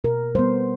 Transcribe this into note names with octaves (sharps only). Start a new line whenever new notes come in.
B2 A#4
G3 B3 C5